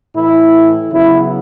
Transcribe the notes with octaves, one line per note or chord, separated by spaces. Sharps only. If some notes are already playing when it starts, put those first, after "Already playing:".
A2 E3 A3 E4
C#3 F#3 B3 E4